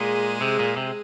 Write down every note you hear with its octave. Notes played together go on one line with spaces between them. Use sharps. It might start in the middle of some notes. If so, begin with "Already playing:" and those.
Already playing: A#2 G#3 G#4
C3
A#2
C3